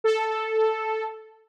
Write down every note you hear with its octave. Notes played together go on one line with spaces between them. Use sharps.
A4